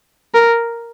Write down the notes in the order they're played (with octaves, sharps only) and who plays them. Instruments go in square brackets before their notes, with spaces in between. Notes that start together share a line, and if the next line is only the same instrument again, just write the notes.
[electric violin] A#4